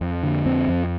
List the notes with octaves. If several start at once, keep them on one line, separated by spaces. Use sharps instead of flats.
F2
D3
F2 C4
F2